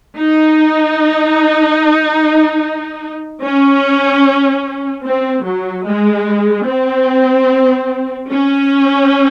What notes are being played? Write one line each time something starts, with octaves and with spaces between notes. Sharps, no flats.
D#4
C#4
C4
F#3
G#3
C4
C#4